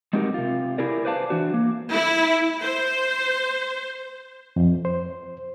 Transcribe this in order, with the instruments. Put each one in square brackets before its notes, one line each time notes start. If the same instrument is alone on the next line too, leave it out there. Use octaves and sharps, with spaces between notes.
[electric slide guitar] G#3 C4 D#4 F#4 G4 A#4
C3 F4
E4 G4 G#4 A#4 D5
B4 C5 D5 F5 A5
E3 D4 F#4
A#3
[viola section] E4
C5
[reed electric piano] F2
C5